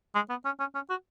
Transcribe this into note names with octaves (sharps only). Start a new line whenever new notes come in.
G#3
B3
C#4
C#4
C#4
F#4